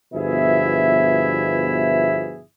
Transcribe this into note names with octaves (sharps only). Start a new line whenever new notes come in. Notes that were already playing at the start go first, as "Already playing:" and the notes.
G1 B2 F3 E4 G#4 E5